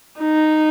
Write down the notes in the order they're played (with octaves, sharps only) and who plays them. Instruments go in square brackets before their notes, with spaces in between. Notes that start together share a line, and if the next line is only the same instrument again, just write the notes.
[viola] D#4